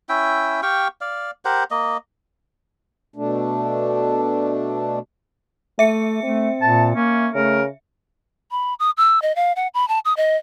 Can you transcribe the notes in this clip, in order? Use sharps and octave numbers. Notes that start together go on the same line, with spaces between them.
C#4 E4 E5 G5
G4 F5 G5 C#6
D5 F5
G4 A#4 C5 F#5
A#3 D#5
B2 A3 D4
A3 E5 C#7
A3 C4
A#2 A5
A#3 C#4
C#3 A3 A#4
B5
D#6
E6
D#5
F5
F#5
B5
A5
D#6
D#5